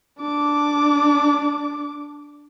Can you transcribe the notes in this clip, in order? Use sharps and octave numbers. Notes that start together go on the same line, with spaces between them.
D4 D6